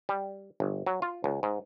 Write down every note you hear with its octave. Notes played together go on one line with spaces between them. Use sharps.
G3
G1
F#3
F4
C#2
G#2